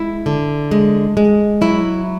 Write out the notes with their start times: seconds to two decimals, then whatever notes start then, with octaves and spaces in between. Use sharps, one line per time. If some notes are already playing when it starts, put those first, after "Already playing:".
Already playing: G#3 E4
0.26 D3
0.71 G#3
1.17 G#3
1.61 F#3 E4